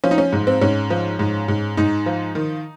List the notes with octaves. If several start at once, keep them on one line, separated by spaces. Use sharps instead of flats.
F3 C#4
D#4
C#4
G#2
C4
G#2 C#4
F3
G#2
G#2
G#2 D#4
F3
D#3